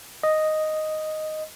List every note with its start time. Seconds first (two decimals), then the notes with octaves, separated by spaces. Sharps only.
0.23 D#5